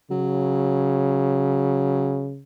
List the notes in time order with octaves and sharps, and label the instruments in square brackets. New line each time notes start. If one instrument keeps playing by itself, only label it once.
[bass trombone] C#3 [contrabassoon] F#3